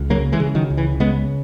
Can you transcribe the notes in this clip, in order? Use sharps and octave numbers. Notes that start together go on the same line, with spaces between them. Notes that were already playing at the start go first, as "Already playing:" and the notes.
Already playing: C#2
C#3 F#3 A#3
E3 G#3
C#3
D#3 F#3
C#2
E3
C#3 G#3 B3